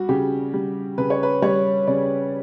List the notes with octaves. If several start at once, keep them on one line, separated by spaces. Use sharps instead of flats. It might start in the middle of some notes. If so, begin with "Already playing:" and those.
Already playing: G3 F#4
C#3 G4
G3
C#3 B4
C#5
B4
G3 C#5
C#3 D5